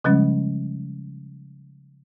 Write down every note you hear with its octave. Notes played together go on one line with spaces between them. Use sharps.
C#3 F3 G3 G#3 C#4